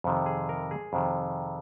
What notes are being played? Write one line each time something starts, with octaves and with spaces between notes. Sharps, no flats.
F2 C3 D#3
G#4
A#4
G#4
F2 C3 D#3